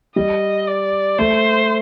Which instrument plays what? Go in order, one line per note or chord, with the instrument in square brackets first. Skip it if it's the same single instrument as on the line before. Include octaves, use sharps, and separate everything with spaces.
[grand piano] G3 [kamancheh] D#5
[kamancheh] D5
[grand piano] A3 [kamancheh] C5